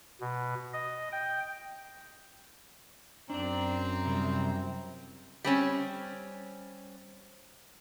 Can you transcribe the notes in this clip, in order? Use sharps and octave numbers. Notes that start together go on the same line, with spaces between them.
B2
D#5
G5
F#2 C4 D4 D5 A#5
C3 G3
G3 C4 C#4